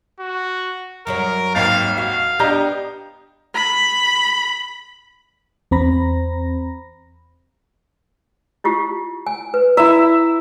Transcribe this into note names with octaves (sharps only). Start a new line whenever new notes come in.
F#4
F#2 F#3 A#4 C#5
G#1 D#2 F5 A6
F#4 F5
B3 D4 G4 D#5 A#5 G6
B5
E2 C4 C5 A#5 B5 A#6
E4 F4 G4
G#5
B4
E4 E5 A#5